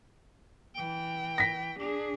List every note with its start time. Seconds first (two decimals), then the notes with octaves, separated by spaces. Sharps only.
0.75 E3 G5
1.38 A#6 B6
1.79 D4 G#4